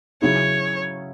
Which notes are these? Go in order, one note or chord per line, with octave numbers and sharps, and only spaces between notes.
C#3 F#3 C#4 E4 G#4 C#5